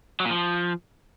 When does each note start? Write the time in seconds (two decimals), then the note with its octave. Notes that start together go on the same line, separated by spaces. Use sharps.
0.20 F#3
0.25 A#2
0.30 F3